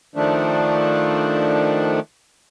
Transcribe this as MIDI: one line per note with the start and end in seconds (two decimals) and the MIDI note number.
0.16 2.00 51
0.16 2.00 53
0.16 2.00 57
0.16 2.00 62